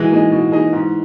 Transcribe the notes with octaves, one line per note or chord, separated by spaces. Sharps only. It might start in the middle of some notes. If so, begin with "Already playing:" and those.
Already playing: B2 E3 G#3
A#3 D#4 G#4 D#5
B2
A#3 D#4 G#4 D#5
G#2